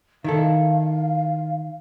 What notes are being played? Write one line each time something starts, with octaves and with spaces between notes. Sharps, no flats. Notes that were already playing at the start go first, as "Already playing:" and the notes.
D#3 E4 A4 F5